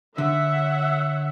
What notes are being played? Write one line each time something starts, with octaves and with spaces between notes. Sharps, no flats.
D3 C#5 E5 F#5